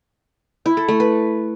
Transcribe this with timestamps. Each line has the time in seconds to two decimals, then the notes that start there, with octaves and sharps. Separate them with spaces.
0.66 E4
0.77 A4
0.88 A3
1.00 B4